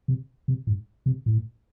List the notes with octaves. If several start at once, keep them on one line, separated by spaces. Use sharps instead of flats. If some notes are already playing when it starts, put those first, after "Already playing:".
C3
C3
G#2
C3
A2